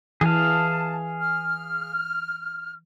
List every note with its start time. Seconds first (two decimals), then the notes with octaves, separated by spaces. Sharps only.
0.21 E3 G#4 F5 A5
1.19 F6